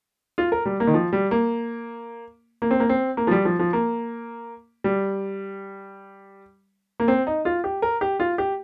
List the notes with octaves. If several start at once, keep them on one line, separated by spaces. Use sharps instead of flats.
F4
A#4
G3
A#3
D#3
F3
G3
A#3
A#3
C4
A#3
C4
A#3
F3
G3
F3
F3
A#3
G3
A#3
C4
D#4
F4
G4
A#4
G4
F4
G4